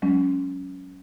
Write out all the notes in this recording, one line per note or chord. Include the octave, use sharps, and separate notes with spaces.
F#3 G#3 C#4